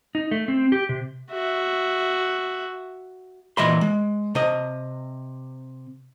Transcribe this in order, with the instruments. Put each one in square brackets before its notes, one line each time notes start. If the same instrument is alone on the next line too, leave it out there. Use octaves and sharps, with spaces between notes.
[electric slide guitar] D#4
A3
C4
G4
C3
[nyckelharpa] F#4 E5
[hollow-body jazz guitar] A#2 E3 D#5 E5 B5 C6
G#3
C3 D#5